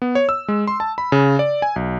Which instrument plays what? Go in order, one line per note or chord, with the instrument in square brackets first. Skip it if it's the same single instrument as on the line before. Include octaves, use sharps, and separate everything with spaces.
[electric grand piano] B3
C#5
E6
G#3
C6
A5
B5
C#3
D5
G#5
B1